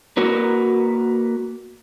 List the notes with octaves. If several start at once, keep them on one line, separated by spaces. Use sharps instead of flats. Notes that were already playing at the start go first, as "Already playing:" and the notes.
A#3 F#4 A#4 B4